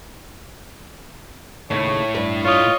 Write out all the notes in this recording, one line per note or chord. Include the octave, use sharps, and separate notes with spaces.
D#2 A2 C#3 A3 C#5
G2 B4
F4 C#5 D#5